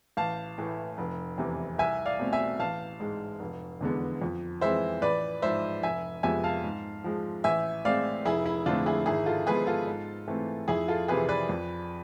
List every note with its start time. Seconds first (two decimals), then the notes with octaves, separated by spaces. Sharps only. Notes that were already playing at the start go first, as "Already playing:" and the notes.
0.17 A1 F5 A5
0.58 A2 E3 A3
0.98 F1
1.38 E2 C3 E3
1.78 C2 E5 G#5
2.06 D5 F5
2.19 B2 A3 C4
2.32 E5 G#5
2.59 A1 F5 A5
3.00 G#2 G#3
3.40 F1
3.81 E2 D3 G#3 B3
4.22 F2
4.61 E3 G#3 C4 C5 E5
5.02 A1 B4 D5
5.42 G#2 F3 C5 E5
5.83 F1 E5 G#5
6.23 F2 C3 G#3 B3 E5 G#5
6.44 F5 A5
6.64 G#2
7.04 F3 G#3
7.44 A1 E5 G#5
7.85 A2 G#3 C4 D5 F5
8.25 F1 E4 G#4
8.46 E4
8.66 F2 D3 A3 C4 D4 F4
8.86 E4 G#4
9.06 G#1 E4 G#4
9.26 F4 A4
9.47 G#2 F3 G#3 B3 G#4 B4
9.67 F4 A4
9.87 G#2
10.28 E3 A3 C4
10.68 F2 E4 G#4
10.88 F4 A4
11.08 C3 E3 G#4 B4
11.29 B4 D5
11.49 F2